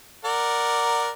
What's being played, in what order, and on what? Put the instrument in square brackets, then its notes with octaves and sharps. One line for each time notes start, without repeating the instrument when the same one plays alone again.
[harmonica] A#4 D5 F#5